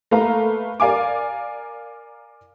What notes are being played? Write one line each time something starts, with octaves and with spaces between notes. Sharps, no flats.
A3 A#3 B4 F5 A#5
A#4 D5 F5 G#5 D6